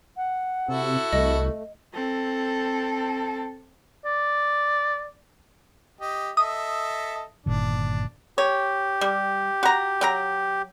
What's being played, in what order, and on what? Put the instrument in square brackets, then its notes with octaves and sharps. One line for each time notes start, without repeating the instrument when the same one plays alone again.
[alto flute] F#5
[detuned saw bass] C3 [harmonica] E4 F#4 A4
[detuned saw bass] C2 [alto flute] A3 [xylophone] D#5
[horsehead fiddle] C4 A4
[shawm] D5
[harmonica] G4 D#5
[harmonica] A4 D#5 E5 [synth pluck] D#6
[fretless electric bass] G1 A#2 D#3 [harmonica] D4
[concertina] G4 [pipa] C#5
[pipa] G3
F#4 A#5
F#3 G5 A#5